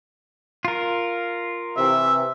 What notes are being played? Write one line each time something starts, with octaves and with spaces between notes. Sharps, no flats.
F4 A#4
C3 E3 E5